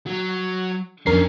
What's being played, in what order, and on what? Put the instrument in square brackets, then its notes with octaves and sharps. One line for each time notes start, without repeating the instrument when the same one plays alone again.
[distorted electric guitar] F#3
[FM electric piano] F2 A#4 C7 [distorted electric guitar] C#4 D4